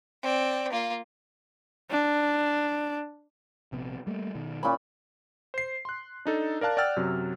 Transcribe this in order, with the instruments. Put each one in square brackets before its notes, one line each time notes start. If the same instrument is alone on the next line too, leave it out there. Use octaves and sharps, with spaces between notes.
[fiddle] C4 D5
A#3 F4
[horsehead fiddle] D4
[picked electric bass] A#1 C3 B3
G3 A3 A#3
B2 D#3
[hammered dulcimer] A#2 C#4 B5
[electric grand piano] C5 C7
C6 F#6
D4 D#4 A4
A#4 D5 F5 A5 F#6
D5 F#5 G5 E6 F6 A6
F#2 C3 F#3